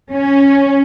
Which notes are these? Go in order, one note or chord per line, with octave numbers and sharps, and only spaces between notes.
C#4